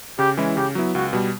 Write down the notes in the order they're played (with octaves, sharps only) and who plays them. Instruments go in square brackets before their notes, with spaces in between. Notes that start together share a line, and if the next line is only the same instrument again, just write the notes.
[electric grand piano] C#3 [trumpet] G4
[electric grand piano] E3 G#3 C#4 E4
[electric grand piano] C#3 [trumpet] G4
[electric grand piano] F#3 B3 E4
[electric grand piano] C#2 [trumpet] F#4
[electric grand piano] B2 G3